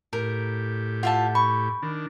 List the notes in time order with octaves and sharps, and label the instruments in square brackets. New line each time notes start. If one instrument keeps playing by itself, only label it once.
[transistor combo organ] A2 G4 [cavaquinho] A#4
[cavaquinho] F4 E5 A5 [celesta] F#5
[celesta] B5 [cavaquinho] C#6
[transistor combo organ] D#3 D4